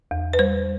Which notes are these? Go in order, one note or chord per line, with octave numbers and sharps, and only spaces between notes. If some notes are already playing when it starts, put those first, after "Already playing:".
E2
B4
G3 C5